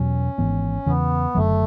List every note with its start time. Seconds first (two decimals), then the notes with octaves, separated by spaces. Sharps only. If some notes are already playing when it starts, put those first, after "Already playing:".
Already playing: E2 B2 F#3 C#4
0.38 G#1 G#2 E3 B3
0.86 E2 C#3 E3 B3
1.35 F#1 F#2 D3 F#3 A3